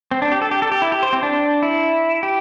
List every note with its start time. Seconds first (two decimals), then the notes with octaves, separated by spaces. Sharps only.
0.11 C4
0.22 D4
0.32 G4
0.42 A4
0.51 G4
0.62 A4
0.72 G4
0.82 E4
0.92 G4
1.03 C5
1.13 C4
1.23 D4
1.63 E4
2.23 G4